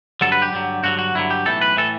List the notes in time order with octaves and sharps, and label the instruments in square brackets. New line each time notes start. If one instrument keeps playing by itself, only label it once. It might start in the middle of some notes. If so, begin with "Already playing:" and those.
[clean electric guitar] G2 D3 F#3 A4
B4
G4
G2 D3 F#3
G2 D3 F#3 F#4
F#4
G2 D3 F#3 E4
G4
B1 A2 E3 A4
B4
A2 E3 A4